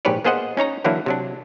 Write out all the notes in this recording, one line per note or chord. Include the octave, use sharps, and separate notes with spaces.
A#1 G#2 G4 B4 C#5 D5
A#3 B3 G#4 C5 D#5 F#5
C#4 D#4 C#5 A#5
D3 E3 F#3 A#3 D4 E4
C3 F#3 D4